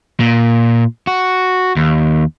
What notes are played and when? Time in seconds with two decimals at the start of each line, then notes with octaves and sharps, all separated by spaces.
0.20 A#2
1.07 F#4
1.76 D#2